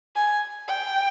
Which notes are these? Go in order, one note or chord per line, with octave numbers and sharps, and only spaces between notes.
G#5
G5